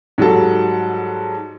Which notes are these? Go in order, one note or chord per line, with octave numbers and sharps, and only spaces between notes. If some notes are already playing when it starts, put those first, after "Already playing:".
G#2 F#3 G3 A4